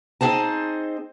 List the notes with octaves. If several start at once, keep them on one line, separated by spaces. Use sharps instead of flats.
C4 D#4 G#4 C5 A5